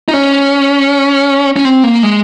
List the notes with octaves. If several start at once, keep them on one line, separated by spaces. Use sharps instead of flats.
D#4
C#4
C#4
C4
A#3
G#3